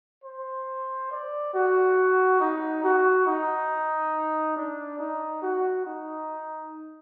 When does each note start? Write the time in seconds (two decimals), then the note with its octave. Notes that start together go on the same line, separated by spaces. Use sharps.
0.24 C5
1.11 D5
1.54 F#4
2.40 D#4
2.84 F#4
3.27 D#4
4.56 D4
4.99 D#4
5.42 F#4
5.85 D#4